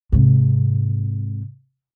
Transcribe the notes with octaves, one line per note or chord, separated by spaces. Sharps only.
G#2 C3